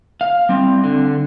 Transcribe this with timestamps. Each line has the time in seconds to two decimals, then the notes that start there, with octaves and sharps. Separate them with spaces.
0.21 F5
0.49 G3 C4
0.84 D3